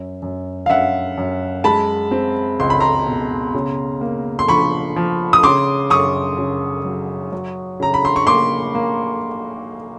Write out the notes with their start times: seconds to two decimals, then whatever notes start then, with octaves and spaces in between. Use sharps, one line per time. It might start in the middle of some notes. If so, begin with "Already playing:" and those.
Already playing: F#2
0.22 F#2
0.66 F5
0.69 F#2 E5 F#5
1.18 F#2
1.64 G#3 A5 B5
2.11 C4
2.60 C#2 C6
2.70 B5
2.80 A#5 C6
3.06 B2
3.54 C#3
4.01 A#3
4.39 C6
4.48 F3 B5 C#6
4.96 F3
5.33 D#6
5.43 C#3 C6 D6
5.90 F#2 C#6 D#6
6.38 C#3
6.85 F#3
7.32 F#3
7.80 C#3 A#5
7.94 B5
8.05 C6
8.16 C#6
8.27 A#3 C6 D6
8.75 A#3